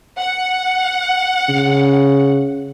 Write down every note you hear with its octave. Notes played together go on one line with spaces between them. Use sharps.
F#5
C#3